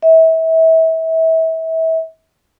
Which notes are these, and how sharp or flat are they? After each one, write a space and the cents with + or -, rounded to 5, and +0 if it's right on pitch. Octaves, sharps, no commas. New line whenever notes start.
E5 -30